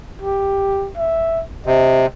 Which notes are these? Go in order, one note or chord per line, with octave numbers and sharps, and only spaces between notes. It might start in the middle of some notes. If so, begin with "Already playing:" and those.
G4
E5
C3 D#5